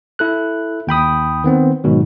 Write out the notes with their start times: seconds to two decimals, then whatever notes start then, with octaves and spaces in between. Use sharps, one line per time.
0.19 E4 A4 F#6
0.87 D#2 G5 B5 D#6
1.44 D#3 B3 C4
1.84 G#2 B2 D#3 F#3